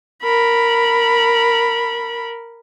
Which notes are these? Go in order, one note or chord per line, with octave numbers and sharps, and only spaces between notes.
A#4 B5